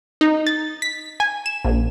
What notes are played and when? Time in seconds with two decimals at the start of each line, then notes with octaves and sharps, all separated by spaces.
0.21 D#4
0.47 A6
0.82 B6
1.20 G#5
1.46 E7
1.65 A#1